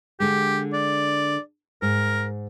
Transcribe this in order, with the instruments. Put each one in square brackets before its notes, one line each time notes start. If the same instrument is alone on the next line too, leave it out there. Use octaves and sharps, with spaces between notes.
[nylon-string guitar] D3 G#3 [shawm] G4
[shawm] D5
[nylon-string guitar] G#2 [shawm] A#4